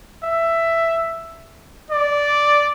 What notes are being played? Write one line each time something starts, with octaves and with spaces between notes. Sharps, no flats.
E5
D5